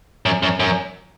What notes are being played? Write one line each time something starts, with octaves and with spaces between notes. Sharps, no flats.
F#2
F#2
F#2